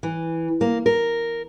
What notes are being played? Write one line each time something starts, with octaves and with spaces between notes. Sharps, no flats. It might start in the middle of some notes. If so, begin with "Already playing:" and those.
E3
A#3
A#4